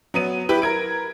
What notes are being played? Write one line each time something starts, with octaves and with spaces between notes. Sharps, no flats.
F#3 B3 D#7
E4 G4 B4
A#4 G#6 D7